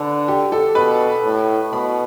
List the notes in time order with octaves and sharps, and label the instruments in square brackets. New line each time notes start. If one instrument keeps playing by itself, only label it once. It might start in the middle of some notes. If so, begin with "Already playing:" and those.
Already playing: [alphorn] D3 [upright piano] A4 B4
[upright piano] G4
A4
[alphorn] B2 [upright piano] B4
[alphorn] A2
[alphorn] B2 [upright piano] B5